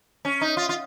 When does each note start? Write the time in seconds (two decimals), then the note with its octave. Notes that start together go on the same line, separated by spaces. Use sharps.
0.25 C#4
0.41 D#4
0.57 F4
0.69 F4